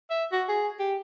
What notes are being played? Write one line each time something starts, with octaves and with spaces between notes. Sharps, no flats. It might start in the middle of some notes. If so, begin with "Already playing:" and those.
E5
F#4
G#4
G4